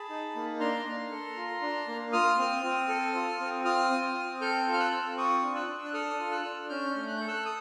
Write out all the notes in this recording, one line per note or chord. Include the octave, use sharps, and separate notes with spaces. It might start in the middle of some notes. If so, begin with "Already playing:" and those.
Already playing: G#4 A5 B5
D#4
A#3
D4 A#5 C6
A#3
A4
F4
D4
A#3
F4 D#6 F6
C4
C4
A4
F4
C4
F4 D#6 F6
C4
C4
A4 F6 G6
F4
F6
E6 F#6
C4
F4 C#6 D#6
D4
E6 F#6
D4
F#6
A4 D#6 F6
F4
E6 F#6
D4
C#4 F6 G6
A3
F#6
A4 G6
E6 F#6
D#6